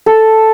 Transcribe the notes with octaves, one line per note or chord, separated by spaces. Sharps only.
A4